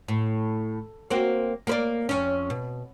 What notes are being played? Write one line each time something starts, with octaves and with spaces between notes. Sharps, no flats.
A2
A#3 C4 F#4
A#3 B4 D5
F2 C#4
B2